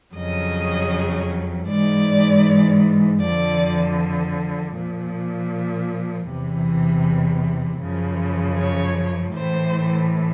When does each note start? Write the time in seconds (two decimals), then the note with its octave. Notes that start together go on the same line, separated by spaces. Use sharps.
0.15 F2 C#3 F#3 D#5
1.69 G#2 E3 D5
3.22 F2 D3 F3 D5
4.75 A#2 F3
6.29 E2 C3 E3
7.82 F#2 C#3 F3
8.58 C#5
9.35 A2 E3 C5